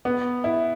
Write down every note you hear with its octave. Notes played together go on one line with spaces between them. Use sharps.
B3
E4